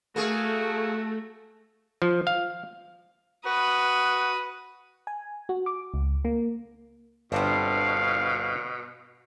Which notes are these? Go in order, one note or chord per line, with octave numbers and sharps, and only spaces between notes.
A3 A#3 F#4 G#4
F3
F5
F#4 B4 D#6
G#5
F#4
D6
C#2
A#3
G1 B2 B3 C4 D4 F5